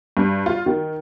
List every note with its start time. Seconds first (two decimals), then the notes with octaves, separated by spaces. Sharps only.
0.17 G2
0.46 F4
0.66 D#3